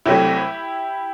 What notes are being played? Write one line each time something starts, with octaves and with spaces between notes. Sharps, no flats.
C2 C3 F#3 A3 E4 G4